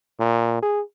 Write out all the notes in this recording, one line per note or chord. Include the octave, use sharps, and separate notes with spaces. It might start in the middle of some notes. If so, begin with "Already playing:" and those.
A#2
G#4